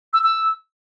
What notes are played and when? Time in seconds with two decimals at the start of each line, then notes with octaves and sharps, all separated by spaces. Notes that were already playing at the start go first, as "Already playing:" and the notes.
0.13 E6
0.23 E6